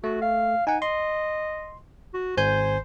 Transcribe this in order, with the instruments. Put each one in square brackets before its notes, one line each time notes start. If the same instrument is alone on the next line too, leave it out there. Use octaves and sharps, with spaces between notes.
[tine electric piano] A3 [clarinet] F#4
[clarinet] F5
[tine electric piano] D#4 F#5 [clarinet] G#5
[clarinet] D#5 [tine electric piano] C6
[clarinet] F#4
[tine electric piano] G#1 G#5 G6 [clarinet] C5